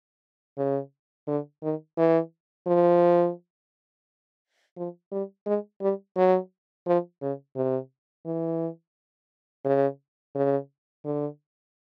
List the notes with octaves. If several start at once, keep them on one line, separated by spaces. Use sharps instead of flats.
C#3
D3
D#3
E3
F3
F3
G3
G#3
G3
F#3
F3
C#3
C3
E3
C#3
C#3
D3